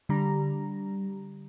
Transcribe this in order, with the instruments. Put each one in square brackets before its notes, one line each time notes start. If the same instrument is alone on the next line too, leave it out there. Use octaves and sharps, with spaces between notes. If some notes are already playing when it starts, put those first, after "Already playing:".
[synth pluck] D3 G3 A#5